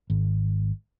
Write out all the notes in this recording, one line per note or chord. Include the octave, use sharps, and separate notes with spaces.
G#1